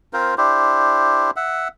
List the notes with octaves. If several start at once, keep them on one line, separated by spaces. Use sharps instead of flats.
C4 F4 A#4 C5
D4 E4 G4 C5
E5 F#5